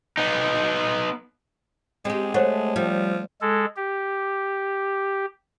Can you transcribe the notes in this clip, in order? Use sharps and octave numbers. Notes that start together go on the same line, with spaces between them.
B3 D#4
G#3 C4 G4
A3 C5 C#5 F#5
F3 G3
G#3 A4
G4